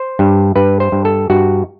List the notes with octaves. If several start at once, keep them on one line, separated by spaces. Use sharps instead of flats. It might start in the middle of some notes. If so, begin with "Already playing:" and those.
Already playing: C5
G2
G2 B4
C5
G2
A4
G2 F#4